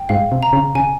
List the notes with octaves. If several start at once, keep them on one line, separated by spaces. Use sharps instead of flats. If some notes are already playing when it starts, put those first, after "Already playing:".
Already playing: G5
G#2 F5
C3
A#5
C#3
C#3 G#5